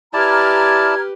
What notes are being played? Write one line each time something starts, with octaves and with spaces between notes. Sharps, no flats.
E4 G4 B4 D5 A5 A#5 F6 G#6